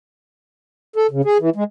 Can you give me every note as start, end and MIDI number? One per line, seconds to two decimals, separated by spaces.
0.96 1.07 69
1.11 1.22 49
1.25 1.38 68
1.40 1.50 52
1.56 1.64 56